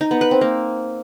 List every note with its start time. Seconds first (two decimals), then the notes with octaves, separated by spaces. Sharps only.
0.01 D#4
0.11 B3
0.21 B4
0.31 C4
0.41 A#3